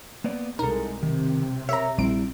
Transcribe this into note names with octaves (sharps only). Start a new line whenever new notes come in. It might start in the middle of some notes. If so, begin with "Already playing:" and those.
A#3 B3 D5
C2 G#3 D#4 A4 A#4
C3 D#3
A#4 C#5 E5 A#5
A#1 G3 C4 E4 D7